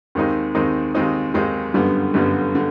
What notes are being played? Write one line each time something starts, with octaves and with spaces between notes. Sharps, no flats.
D#2 D#3 G#3 C4 D#4
D#2 D#3 G#3 C4 D#4
D#2 D#3 G#3 C4 D#4
D#2 D#3 G#3 C4 D#4
G1 F#2 D3 G3 B3
G1 F#2 D3 G3 B3
D3